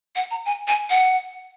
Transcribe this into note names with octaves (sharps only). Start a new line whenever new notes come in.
F#5
A#5
G#5
G#5
F#5